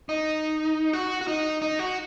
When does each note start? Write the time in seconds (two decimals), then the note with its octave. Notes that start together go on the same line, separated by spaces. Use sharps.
0.09 D#4
0.93 F#4
1.21 F#4
1.28 D#4
1.62 D#4
1.79 F#4